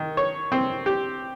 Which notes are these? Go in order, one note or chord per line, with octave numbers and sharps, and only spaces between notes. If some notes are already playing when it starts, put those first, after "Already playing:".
Already playing: D#3
C#5
C4
G4